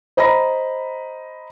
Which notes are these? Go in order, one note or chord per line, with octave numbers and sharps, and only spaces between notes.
C5 D#5 A#5 B5 A#6